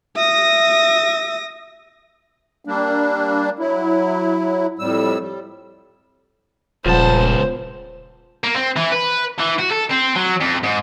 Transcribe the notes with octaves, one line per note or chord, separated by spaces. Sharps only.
E5 D#6 A#6
G3 A#3 D4
F#3 E4
F2 A2 G3 E6
G3
D#1 C#2 F3 B3 C5 A5
A#3
C4
E3
B4
E3
F#4
A4
C4
F#3
F2
G#2